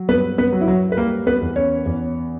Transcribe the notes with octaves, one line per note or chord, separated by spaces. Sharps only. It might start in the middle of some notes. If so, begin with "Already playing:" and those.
Already playing: F#3
G2 B3 B4
B3 B4
F#3
E4
F#3 F#4
B4
G3 A#3 A#4
B3 B4
E2
C#4 C#5
E2